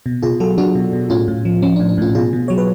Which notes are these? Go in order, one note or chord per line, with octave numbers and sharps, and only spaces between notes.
B2
B2 F4 G#4
F#3 F#4 A4
F#3 D4 F#4
B2
B2
A2 C#4 F4
A2
F3
F3 C#4
D4
A2
D4
A2 C#4 F4
B2 F4 G#4
B2
F#3 C#5
B4